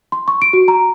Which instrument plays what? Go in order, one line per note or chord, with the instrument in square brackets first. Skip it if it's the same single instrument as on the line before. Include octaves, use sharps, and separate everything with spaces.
[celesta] C6
C#6
D7
F#4
A#5